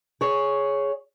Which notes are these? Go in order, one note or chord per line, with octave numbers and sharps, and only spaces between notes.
G#4 C#5